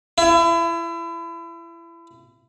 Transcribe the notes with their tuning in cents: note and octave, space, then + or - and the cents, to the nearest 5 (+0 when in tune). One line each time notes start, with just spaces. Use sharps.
E4 +30